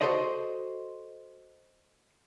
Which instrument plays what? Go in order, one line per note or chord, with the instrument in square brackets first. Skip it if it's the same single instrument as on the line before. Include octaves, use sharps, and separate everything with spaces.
[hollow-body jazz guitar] F#4 G4 A4 C5 D5 D#5